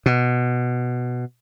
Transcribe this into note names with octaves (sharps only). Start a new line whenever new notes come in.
B2